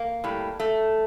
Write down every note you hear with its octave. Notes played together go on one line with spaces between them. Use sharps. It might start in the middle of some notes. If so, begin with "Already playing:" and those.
Already playing: A#3
A2 G3
A3